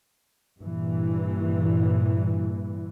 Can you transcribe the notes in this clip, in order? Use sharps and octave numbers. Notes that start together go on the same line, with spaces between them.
G2 A#2 E3